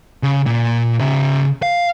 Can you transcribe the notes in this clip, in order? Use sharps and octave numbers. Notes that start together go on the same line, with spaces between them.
C#3
A#2
C#3 E5
F5